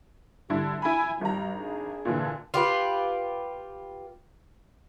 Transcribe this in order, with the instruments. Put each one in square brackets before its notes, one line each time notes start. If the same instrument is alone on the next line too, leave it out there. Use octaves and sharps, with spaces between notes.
[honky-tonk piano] D3 E4 [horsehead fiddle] G3
[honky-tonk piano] E4 B5 [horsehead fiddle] G#5
[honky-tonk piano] G#1 A#5 [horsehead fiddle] G3
[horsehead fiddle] D4 G#4
[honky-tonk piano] A#2 D3 E3
[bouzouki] F4 G4 B4